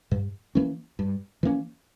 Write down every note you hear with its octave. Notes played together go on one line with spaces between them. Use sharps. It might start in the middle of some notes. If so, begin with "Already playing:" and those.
G2
E3 A#3 C#4
G2
E3 A#3 C#4